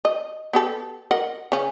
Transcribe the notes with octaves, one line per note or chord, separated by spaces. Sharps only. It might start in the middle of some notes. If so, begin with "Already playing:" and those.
D#5
B3 G4 A4
A#4 D#5 F#5
C#3 C#4